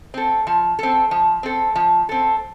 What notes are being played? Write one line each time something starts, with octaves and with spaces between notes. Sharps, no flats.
C4 A4
F3
C4 A4
F3
C4 A4
F3
C4 A4